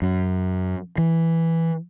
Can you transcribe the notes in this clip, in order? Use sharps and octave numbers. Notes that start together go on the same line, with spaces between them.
F#2
E3